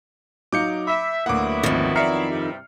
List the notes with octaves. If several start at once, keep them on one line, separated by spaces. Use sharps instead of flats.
F#3 D#4 F5 D6 G6 C#7
E5 B5
D2 F#3 A#3 B3 E4 F#5 D6
G#1 F2 D#3
D5 E5 A#5 F6 C7 C#7
G2 C3 G3